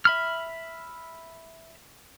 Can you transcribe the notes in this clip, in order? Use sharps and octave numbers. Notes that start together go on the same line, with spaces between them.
E5 B5 F6